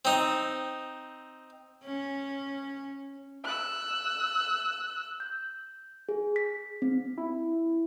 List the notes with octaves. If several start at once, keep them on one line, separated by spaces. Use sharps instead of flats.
C4 D#4
C#4
E6 F#6
G6
G#4
B6
C4
E4